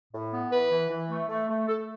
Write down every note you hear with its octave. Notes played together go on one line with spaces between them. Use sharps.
A2
B3
E3 B4
E3
E3
A3
A3
A3
A3 A4